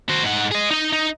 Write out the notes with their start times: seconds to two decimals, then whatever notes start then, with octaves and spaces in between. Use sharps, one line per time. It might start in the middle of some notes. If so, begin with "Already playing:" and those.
0.09 F#4 C5
0.23 G#2 F#5
0.51 G#4 D#5
0.71 D#4 D#5
0.93 D#4